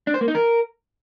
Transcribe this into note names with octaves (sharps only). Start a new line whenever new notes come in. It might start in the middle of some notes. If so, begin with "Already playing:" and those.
D4
C5
A#3
D#4
A#4